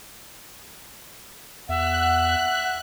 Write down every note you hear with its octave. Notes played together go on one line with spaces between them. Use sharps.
E2 E5 F#5 F#6